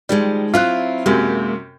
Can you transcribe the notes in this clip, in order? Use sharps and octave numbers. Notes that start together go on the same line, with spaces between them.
D#3 F3 G3 G#3
F#3 C4 E4 F4 F#6
F#2 C3 G#3 A#3